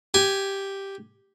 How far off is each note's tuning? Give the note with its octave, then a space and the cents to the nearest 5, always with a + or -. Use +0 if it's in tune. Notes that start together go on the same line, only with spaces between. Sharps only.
G4 +0 G#5 +0